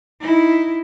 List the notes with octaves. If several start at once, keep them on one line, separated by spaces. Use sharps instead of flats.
D#4 E4